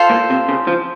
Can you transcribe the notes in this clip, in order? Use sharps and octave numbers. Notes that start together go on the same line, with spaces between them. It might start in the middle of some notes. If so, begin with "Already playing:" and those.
Already playing: F4 A4 C5
A#2
C3
C#3
F3